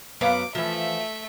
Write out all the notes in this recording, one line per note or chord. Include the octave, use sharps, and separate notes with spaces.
F#2 B3 F5 D6
E3 F3 A3 E5